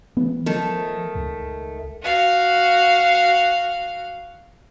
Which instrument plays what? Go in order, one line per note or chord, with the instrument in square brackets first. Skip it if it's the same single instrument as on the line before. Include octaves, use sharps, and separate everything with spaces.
[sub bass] E3 [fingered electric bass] B3
[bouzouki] D#3 A3 [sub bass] F3
[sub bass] C#2
[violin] F#4 F5